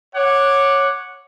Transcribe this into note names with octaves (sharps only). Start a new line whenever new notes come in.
C#5 F#5 D6